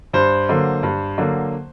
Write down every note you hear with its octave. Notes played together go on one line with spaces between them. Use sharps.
G2 C5
D3 F#3 A#3
G2
D3 F#3 A#3